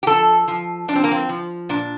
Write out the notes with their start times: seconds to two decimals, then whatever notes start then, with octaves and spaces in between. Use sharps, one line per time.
0.03 G4
0.07 F3 A4
0.48 F3
0.88 F3 D4
0.95 C4
1.04 A#3
1.11 C4
1.29 F3
1.69 A#2 D4